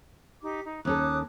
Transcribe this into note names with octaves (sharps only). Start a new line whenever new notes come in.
D#4 G4 D6
D#4
D#2 C#4 A4 D6 D#6 F#6